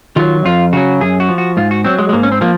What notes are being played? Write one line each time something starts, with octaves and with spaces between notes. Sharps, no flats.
D#3 F#3 F4
F2 F4
C#3 F#3 F#4
F#2 G#4
F#4
F3
F#4
G#2 F4
F#4
F#3 C4
G#3
G#3
G#2 A#3
C#4
C4
F3 A#3